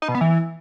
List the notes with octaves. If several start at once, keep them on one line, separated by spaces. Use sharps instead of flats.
D#4
B2
B3
E3